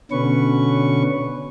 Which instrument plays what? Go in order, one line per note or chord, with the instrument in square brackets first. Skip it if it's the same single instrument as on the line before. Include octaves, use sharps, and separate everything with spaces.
[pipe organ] B2 D3 C#4 B4 C#6